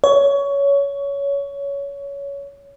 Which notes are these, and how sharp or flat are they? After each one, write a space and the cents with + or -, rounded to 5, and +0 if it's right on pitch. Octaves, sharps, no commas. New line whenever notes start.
C#5 +20